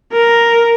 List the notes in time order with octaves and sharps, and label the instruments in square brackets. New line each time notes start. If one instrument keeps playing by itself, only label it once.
[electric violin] A#4